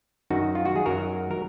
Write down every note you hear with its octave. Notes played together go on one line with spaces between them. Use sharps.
F#2 D#3 F#3 D#4 F#4
F4
F#4
G#4
F#2 D#3 F#3 F#4 A#4
A#4